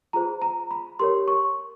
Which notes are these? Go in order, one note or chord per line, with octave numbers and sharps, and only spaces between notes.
F4 G#4 C5 A#5
A#5
B5
G4 A#4 C#5 C6
C#6